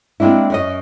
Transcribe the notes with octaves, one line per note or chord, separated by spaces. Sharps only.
G#3 A#3 C4 D4 E4
F#2 C#4 D#5